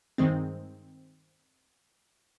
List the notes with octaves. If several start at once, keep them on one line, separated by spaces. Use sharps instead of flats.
G2 D#3 G#3 C4